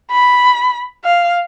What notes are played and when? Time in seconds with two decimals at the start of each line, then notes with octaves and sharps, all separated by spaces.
0.11 B5
1.05 F5